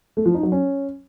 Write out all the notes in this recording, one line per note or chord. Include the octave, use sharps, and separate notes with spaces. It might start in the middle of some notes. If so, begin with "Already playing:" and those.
A3
F3
D#4
F#3
C#4